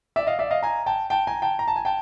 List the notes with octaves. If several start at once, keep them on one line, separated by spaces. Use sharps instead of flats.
D5 E5
D#5 F5
D5 E5
D#5 F5
G#5 A#5
G5 A5
G5 A5
G#5 A#5
G5 A5
A#5
A5
G#5
G5 A5